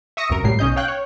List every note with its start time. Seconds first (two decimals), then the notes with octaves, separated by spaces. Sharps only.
0.17 E5 C#6 D#6 A#6 C#7
0.30 C2 F#2 A#4
0.44 G#1 A2 F#3 G3 C7
0.59 B1 C#4 D#5 G6
0.76 C#5 F5 G5 F#6
0.88 C#5